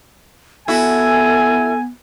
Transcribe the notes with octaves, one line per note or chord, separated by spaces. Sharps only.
B3 E4 F#4 A4 G#5